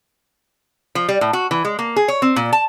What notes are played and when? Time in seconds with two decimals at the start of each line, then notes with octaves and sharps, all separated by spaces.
0.95 F3
1.09 G3
1.21 A2
1.33 F#4
1.51 E3
1.65 G#3
1.79 A#3
1.96 G#4
2.08 C#5
2.22 C4
2.36 A#2
2.53 A5